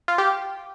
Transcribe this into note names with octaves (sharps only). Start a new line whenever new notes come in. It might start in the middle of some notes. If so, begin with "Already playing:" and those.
F4
G4